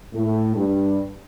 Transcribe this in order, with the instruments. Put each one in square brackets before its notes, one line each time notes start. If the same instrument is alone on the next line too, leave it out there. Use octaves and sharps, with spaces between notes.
[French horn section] A2 A3
G2 G3